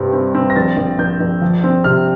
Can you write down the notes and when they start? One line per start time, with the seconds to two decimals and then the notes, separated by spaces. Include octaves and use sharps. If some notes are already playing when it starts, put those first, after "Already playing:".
Already playing: G2 C3 C4
0.13 C4
0.35 C4
0.50 A#6
0.56 A#1 A6
0.77 A#1
0.99 A#1 G6
1.20 A#1
1.41 F3
1.64 C4
1.84 C3 F6